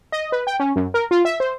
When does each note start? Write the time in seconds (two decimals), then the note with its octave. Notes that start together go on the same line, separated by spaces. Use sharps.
0.12 D#5
0.32 B4
0.47 G5
0.60 C#4
0.76 F#2
0.94 A#4
1.11 F4
1.25 E5
1.40 C5